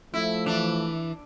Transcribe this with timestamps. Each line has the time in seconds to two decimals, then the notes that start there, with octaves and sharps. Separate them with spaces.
0.14 F3 A3 E4
0.46 E3 D4